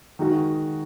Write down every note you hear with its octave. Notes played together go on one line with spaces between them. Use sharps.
D#3 G#3 D#4 F#4